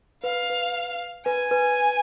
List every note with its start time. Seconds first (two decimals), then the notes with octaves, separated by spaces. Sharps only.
0.23 B4 F5
0.50 B4
1.25 B4 G#5
1.51 B4